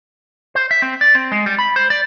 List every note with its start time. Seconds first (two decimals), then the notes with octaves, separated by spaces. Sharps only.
0.55 C5
0.71 E5
0.82 C4
1.01 D5
1.15 C4
1.32 G#3
1.46 G3
1.59 B5
1.76 C5
1.90 D5